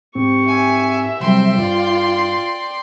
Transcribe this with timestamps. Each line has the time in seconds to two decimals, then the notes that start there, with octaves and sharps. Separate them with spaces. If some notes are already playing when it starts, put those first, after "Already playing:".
0.15 G#2 C4 G4 C#6
0.48 E5 G#5
1.20 C3 F#3 G3 C4 G5 C6
1.58 G2 F4 D5